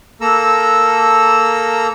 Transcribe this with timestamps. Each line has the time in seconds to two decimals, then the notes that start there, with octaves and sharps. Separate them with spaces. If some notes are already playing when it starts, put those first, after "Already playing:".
0.21 A#3 A4 A#5 E6